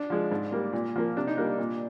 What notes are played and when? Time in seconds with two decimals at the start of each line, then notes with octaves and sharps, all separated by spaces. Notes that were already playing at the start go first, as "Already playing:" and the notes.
Already playing: D4
0.10 F3 G#3
0.31 G#2
0.52 G3 A#3
0.73 A#2
0.96 F3 A#3
1.16 C3 D4
1.27 D#4
1.37 G3 A#3 D4
1.59 A#2